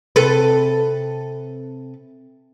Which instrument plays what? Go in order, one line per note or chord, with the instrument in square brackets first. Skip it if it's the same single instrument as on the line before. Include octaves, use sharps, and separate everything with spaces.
[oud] C3 A4 B4